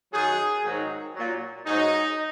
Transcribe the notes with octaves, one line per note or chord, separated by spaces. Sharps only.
F#2 D#3 F#3 G#4
G#2 D#3 F#3
A#2 F#3
G#2 F#3 D#4